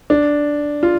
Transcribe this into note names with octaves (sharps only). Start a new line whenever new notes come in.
D4
F4